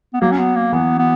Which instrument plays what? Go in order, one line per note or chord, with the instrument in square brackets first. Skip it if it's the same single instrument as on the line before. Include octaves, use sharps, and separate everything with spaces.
[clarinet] B3
[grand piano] F#3 [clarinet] A#3
[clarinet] C#4
B3
A#3
[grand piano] E3 [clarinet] B3
[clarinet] B3